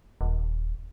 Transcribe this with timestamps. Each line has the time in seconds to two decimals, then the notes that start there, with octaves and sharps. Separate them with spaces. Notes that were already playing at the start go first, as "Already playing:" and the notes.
0.21 D#1